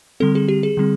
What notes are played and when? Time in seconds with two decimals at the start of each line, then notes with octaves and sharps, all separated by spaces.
0.20 D3 G3 C4 A4
0.35 G#4
0.49 G4
0.63 G#4
0.77 D3 G3 C4